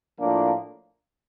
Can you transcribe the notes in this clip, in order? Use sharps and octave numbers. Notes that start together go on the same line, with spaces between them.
A2 F3 A#3 D4